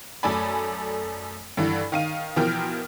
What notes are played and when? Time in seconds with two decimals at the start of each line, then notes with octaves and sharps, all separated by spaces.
0.23 F#2 A3 A4 D5 G#5 B5
1.57 G2 D3 E3
1.92 D#3 F5 D#7
2.36 B2 E3 F3 A#4 G5 F6